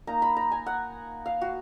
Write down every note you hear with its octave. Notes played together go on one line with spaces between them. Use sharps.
A#3 D#4 A#5
B5
A#5
G#5
F#5
F5
F#4